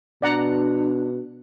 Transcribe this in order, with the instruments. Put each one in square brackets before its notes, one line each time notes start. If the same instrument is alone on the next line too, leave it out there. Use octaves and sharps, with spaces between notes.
[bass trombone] B2 [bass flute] D4 [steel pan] D5 F#5 A#5